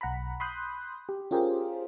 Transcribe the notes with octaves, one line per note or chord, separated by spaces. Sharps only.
B1 F#5 A#5 B5
B5 C6 D#6 F#6 G6
G4
C#4 F4 G4 G#4 A#4 C5